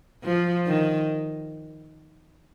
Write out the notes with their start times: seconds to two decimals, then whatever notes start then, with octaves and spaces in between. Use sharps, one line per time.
0.24 F3
0.66 D#3